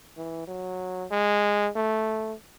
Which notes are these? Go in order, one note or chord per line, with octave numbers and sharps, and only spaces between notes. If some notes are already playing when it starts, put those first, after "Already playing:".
E3
F#3
G#3
A3